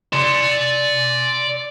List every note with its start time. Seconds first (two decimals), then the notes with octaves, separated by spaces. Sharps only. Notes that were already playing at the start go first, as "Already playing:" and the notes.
0.13 D5 C6